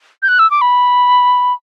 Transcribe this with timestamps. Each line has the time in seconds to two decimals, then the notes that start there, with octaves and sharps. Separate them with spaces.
0.23 G6
0.28 F#6
0.39 E6
0.51 D6
0.61 B5